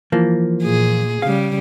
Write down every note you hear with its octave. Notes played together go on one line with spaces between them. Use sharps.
E3 F3 A#3
A#2 G#4
C#3 G3 F5